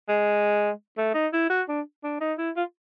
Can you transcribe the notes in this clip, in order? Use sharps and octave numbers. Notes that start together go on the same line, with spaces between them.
G#3
A3
D#4
E4
F#4
D4
D4
D#4
E4
F4